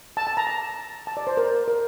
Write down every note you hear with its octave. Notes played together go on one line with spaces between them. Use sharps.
A5
A5
A#5
A5
A5
D5
C5
A#4
A#4